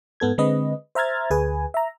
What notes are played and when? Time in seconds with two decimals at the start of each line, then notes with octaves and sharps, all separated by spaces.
0.20 G#2 B3 A4 G#6
0.38 D3 G#3 C4 B4 D#5
0.95 C5 E5 A#5 F6 G#6 A6
1.30 D2 G#4 B4 G#5
1.74 E5 A#5